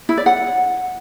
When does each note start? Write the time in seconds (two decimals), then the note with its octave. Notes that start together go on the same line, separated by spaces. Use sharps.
0.09 E4
0.17 D5
0.26 F#5